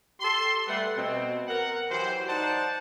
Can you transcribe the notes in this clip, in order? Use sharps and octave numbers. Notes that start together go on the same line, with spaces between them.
G4 A4 C6
G3 A3 B4 F#5
B2 C4
A#4 F#5
E3 F#3 G4 C5
D#4 C5 D5 F#5 A5